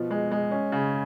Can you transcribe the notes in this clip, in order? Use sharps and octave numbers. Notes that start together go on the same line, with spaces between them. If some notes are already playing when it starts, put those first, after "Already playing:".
Already playing: B2 F3
G#3
G#3
C#4
C#3